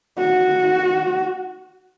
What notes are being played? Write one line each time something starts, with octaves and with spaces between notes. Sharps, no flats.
F#4